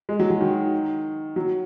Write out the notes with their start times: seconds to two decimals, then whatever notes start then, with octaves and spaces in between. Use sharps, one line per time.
0.09 G#3
0.19 F#3
0.31 F#3
0.41 D#3
1.36 F#3